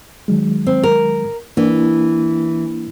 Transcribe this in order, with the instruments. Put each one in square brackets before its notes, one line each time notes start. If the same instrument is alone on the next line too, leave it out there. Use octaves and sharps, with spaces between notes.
[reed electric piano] D#3 F#3 G#3
[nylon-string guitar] C4
A#4
[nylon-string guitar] E3 [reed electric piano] A#3 D4